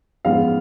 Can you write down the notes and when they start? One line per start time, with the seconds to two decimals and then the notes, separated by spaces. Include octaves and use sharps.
0.25 A1 G#2 F3 G#3 B3 F5